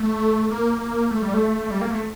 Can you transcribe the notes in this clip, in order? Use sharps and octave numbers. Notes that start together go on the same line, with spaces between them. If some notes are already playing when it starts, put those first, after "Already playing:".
Already playing: A3
A#3
A3
G3
A3
G3
A#3
A3